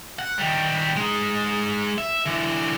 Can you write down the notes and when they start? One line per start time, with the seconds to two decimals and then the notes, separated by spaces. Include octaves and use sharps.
0.19 F#5
0.38 D#3 G3
0.96 G#3 D#4
1.98 E5
2.26 D3 E3